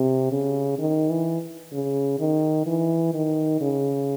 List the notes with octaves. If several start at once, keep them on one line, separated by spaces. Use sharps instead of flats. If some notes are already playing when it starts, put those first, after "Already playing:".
Already playing: C3
C#3
D#3
E3
C#3
D#3
E3
D#3
C#3